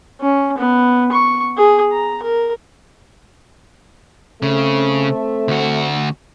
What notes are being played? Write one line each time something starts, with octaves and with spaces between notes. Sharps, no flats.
C#4
B3
C#6
G#4
A#5
A#4
C#3 A3 C4
D2 F#4